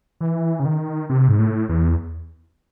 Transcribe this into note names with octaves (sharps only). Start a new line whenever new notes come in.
E3
C#3
D#3
C3
G#2
A2
E2